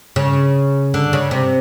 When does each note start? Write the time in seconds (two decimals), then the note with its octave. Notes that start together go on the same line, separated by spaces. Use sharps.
0.16 C#3
0.94 D3
1.13 C#3
1.31 C3